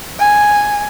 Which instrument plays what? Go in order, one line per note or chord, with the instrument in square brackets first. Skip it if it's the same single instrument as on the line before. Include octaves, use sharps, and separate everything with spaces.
[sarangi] G#5